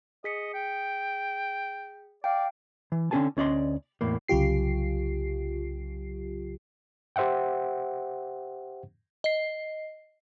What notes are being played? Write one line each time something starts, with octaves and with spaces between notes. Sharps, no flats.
G#4 D#5 B6 C#7
G5
D5 F5 G5
E3
D3 C4 C#4 G#4 G#5 A5
D2 C#4 D5 D#5 C6
E2 A2 A#3
C2 C#3 F#3 F4 G4 C7
G4 C5 E5 F#5 G5
D#5 C7